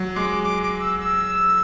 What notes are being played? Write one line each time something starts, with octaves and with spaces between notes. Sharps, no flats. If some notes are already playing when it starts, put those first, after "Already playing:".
Already playing: F#3
G#3 D6
D6
D6
E6
E6